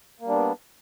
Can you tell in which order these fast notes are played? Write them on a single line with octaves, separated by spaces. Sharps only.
A#3 G3 D4 B3